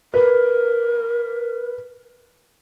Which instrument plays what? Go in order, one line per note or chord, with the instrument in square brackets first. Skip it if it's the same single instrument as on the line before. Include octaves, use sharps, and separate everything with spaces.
[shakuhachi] A#4 [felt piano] B4